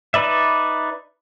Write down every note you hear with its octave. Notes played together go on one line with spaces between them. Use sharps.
D#4 B4 D5 E5